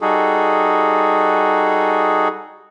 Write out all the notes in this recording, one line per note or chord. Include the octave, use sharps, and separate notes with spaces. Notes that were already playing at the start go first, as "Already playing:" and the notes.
G3 D#4 F#4 G#4 A4